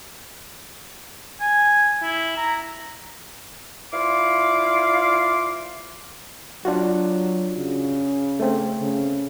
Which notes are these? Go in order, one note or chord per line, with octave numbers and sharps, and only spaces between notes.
G#5
E4
A#5
E4 F4 C5 D5 F5 D6
F#3 D4 F4 F#4
C#3
A3 C4
C#3